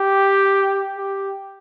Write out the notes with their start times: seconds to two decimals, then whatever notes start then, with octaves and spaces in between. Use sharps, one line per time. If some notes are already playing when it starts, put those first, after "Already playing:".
Already playing: G4
0.98 G4